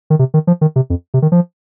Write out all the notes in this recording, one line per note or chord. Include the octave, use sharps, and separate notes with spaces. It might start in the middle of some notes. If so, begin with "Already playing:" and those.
D#3
C3
D#3
F3
D#3
C3
F2
C3
D#3
F3